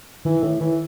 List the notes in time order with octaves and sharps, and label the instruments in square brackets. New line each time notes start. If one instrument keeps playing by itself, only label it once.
[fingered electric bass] D#3 [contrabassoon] E3
[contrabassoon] A2 [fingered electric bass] D#3
[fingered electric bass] D#3 [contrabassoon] E3